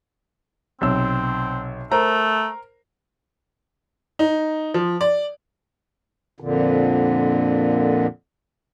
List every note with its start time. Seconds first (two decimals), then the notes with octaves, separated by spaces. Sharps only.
0.81 B1 C3 C4 E6
1.92 A3 A#4 C5 A#5
4.19 D#4
4.74 F3
5.01 D5
6.40 F2 A#2 D3